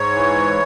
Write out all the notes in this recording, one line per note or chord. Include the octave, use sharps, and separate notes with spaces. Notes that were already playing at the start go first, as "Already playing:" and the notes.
Already playing: G#2 C#5
E3